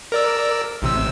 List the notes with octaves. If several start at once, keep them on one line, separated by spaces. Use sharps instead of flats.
A#4 D5 E6
A1 C3 E6